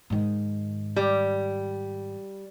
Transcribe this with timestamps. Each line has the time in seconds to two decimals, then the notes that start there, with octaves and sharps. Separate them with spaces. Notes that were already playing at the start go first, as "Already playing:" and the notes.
0.10 G#2 D#3
0.96 G3